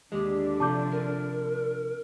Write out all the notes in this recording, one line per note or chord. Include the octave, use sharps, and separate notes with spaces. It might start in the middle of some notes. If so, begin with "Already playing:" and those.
D#2 D3 G#3 D4 G4
C3 F3 A3 A5 D6 G6
A#4